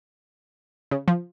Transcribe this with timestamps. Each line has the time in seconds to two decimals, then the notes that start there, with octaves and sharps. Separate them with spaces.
0.91 C#3
1.08 F3